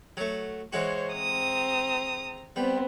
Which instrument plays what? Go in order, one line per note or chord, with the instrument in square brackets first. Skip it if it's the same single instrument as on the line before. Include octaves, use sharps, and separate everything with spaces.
[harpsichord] F#3 A3
[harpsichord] E3 G#3 F#4 [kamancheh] C5 C#5
[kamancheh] C4 A#5 [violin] D#6
[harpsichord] G3 [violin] B3 C4